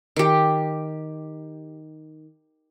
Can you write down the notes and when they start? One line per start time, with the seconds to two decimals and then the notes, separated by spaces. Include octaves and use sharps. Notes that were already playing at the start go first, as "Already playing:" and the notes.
0.16 D#3 G4